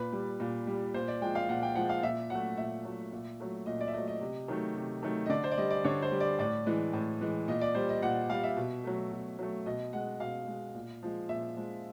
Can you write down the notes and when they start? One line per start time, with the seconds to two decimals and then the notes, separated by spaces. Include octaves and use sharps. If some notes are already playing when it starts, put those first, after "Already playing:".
Already playing: A#2 B4
0.12 G3
0.40 A#2
0.67 G3
0.94 A#2 C5
1.08 D5
1.22 F3 G#3 G5
1.35 F5
1.49 A#2 F#5
1.63 G5
1.75 F3 G#3 F#5
1.89 F5
2.03 A#2 E5
2.30 F#3 A3 F#5
2.58 A#2 E5
2.85 F#3 A3
3.12 A#2
3.40 F#3 A3
3.66 A#2 D#5
3.81 D5
3.88 E5
3.94 F#3 A3 D#5
4.08 D#5
4.21 C3
4.48 D#3 F#3 A3
4.76 C3
5.03 D#3 F#3 A3
5.26 D#5
5.29 D3 D5
5.44 C5
5.51 D5
5.58 G3 D#5
5.71 D5
5.85 D3 C#5
6.02 C5
6.12 G3
6.20 D5
6.39 A2 D5
6.66 E3 G#3
6.93 A2
7.21 E3 G#3
7.48 A#2 D#5
7.61 D5
7.75 G3 C5
7.89 D#5
8.02 A#2 F#5
8.30 G3 F5
8.43 E5
8.57 B2
8.84 F#3 A3
9.11 B2
9.39 F#3 A3
9.66 B2 D#5
9.93 G#3 F#5
10.20 B2 F5
10.48 G#3
10.75 A#2
11.03 F3 G#3
11.29 A#2 E5
11.57 F3 G#3